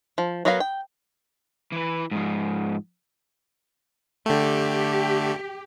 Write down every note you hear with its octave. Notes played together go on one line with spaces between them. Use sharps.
F3
F#3 B3 A#4 B4 F5
G5
E3 B4
G#2 F3
D3 A3 G4